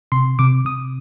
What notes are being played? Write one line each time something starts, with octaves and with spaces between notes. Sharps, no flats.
C3 C6
C3 D6
C3 D#6